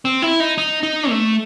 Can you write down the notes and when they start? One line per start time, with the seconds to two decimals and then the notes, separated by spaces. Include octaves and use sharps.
0.05 C4
0.22 E4
0.40 D#4
0.58 D#4
0.83 D#4
1.10 A3